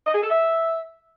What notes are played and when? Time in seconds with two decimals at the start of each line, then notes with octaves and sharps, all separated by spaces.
0.07 D#5
0.14 G#4
0.22 A4
0.30 E5